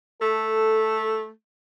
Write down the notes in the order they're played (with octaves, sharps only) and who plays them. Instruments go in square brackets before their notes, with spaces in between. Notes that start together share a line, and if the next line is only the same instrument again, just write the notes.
[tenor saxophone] A3 [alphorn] A4